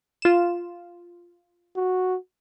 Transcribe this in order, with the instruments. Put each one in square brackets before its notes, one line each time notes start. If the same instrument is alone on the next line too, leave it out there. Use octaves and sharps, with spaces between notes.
[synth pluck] F4 E7
[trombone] F#4